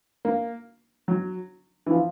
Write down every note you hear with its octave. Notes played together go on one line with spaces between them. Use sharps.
A#3
F#3
E3
F3